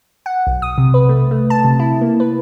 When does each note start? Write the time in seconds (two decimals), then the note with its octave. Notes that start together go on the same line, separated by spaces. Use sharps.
0.26 F#5
0.47 B1
0.62 D#6
0.78 C3
0.94 B4
1.09 A3
1.31 A3
1.50 A5
1.65 C3
1.79 E4
2.01 A#3
2.20 B4